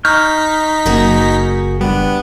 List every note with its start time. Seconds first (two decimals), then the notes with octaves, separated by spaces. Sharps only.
0.05 D#4 C#6 F6 G6 B6
0.86 F#1 A#3 F#4 G#4
1.81 G3 B3 D4